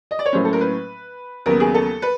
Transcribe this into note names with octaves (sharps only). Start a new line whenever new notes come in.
D#5
D5
C#5
A2 F#3 A#3 C#4 C5
A4
A#4
B4
D#2 C#3 F#3 B3 A#4
G#4
A4
B4